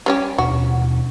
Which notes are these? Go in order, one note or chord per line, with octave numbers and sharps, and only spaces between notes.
G3 C#4 G4
D#2 B2 D4 F#4